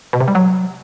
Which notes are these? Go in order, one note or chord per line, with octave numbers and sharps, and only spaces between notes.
B2
C3
G3
F#3